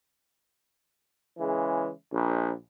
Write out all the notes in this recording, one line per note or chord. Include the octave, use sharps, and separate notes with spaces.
C#3 E3 G#3
A#1